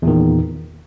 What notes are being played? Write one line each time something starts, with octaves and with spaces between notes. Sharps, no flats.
E2 A#2 D#3